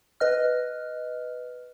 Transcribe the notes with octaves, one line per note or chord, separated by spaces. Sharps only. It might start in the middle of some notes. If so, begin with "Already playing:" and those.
B4 D#5 F6